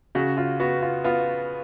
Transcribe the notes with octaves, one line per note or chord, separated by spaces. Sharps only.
C#3 F#4
F4
B3 F#4
F4
B3 F4